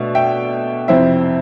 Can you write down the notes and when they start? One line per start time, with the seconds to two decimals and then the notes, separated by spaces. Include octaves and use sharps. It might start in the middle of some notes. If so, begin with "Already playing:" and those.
Already playing: B2 A3 D4 E5
0.15 E5 G5
0.88 F2 C3 F3 C4 E4 C5 E5